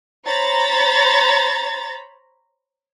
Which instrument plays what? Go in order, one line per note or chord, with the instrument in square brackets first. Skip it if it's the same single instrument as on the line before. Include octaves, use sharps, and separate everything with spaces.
[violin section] C5 C#5 A#5 B5 A6